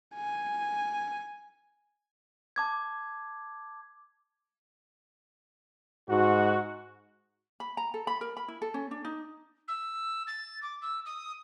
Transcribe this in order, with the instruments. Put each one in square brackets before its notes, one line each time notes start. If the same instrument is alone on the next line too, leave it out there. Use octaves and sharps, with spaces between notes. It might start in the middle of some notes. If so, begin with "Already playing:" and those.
[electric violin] G#5
[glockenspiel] A5 D6 G#6
[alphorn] G#2 [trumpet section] F#4
[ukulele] B5
A#5
A4
B5
A#4
B5
E4
A4
C#4
D4
D#4
[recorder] E6
A6
D6
E6
D#6